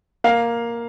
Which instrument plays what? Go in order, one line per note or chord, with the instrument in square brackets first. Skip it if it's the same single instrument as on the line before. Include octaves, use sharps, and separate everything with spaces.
[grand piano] A#3 F5